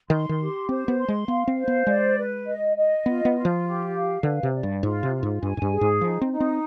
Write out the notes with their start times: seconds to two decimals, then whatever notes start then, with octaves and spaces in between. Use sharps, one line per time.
0.10 D#3 C6
0.29 D#3
0.39 G4
0.69 C4 C5
0.88 B3
0.99 C6
1.08 G#3
1.28 B3 F5
1.48 C4
1.58 C5
1.68 B3
1.87 G#3 D5
2.17 B4
2.47 D#5
2.76 D#5
3.06 B3 F4
3.25 B3
3.35 F4
3.45 F3
3.65 G4
3.94 F5
4.23 D3 B4
4.43 C3
4.54 D5
4.63 G2
4.83 G#2 F4
5.03 C3
5.13 F4
5.23 G#2
5.42 G2 G#5
5.57 G#2
5.62 G2
5.72 G#4
5.81 G#2
6.01 F3 D#4
6.21 C4
6.31 D#4
6.40 C4